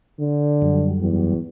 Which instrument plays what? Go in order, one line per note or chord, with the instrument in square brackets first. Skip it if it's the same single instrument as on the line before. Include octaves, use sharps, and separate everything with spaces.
[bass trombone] D3
[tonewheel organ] F#2 F#3 G3
[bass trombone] E2